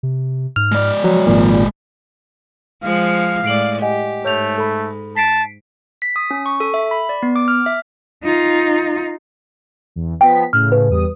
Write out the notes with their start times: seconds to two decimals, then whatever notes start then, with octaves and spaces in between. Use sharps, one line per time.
0.03 C3
0.56 G#2 F6
0.72 G#3 D5
1.04 F3 F#3
1.27 G#1 A#2 F3
2.83 F3 G#3 F5
3.44 A2 G#3 D5 C7 D7 F#7
3.82 G4 D#5 F#5 G#5
4.25 G#2 A3 C#5 G6 F7
4.58 A4 B5
5.16 A5 B6 C7 D7
6.02 B6
6.16 D#6
6.31 C#4
6.46 C#6
6.60 A4
6.74 E5
6.91 B5
7.09 D5
7.23 B3
7.36 D6
7.48 F6
7.66 E5
8.23 D#4 F4
9.96 E2
10.21 F3 B3 G5 B6
10.53 A2 C#3 F6
10.72 B4
10.89 E2 G3 D#6